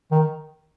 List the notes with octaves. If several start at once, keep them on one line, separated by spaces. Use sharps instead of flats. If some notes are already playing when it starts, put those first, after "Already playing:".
D#3